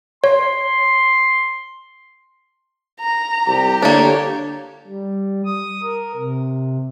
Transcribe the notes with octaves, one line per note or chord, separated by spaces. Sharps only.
C#5 C6
A#5
C2 G4
D3 A#3 D4 C#5
G3
D#6
A#4
C3